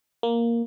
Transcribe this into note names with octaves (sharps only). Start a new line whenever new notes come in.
A#3